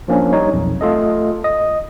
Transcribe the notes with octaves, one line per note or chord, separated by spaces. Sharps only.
F3 A#3 C#4 D4
G3 D#4 C#5
B1 F2
A3 F4 A4 D#5
D#5